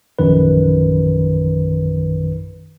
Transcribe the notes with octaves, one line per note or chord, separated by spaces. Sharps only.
A#1 F#2 D#3 B4